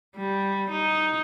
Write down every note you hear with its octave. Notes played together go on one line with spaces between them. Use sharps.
G3
D#4